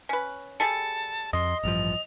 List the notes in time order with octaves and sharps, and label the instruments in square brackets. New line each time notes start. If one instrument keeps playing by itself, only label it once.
[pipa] C#4 B4
[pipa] G3 G#4 A4 [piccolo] A5 [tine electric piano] C#7
[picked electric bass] F2 [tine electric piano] D#5 [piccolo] C6
[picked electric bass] A1 G2 F3 [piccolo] F7